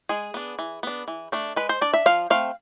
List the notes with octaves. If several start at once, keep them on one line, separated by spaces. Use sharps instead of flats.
G#3 G#4
B3 D4
E3
B3 D4
E3
A3 D4
G#3 B4
C5
D4 D5
E5
F3 F5
A3 C4 F5